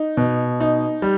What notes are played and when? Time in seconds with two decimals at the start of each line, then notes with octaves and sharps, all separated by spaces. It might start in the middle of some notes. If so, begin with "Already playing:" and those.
Already playing: D#4
0.17 B2
0.60 D#4
1.02 G3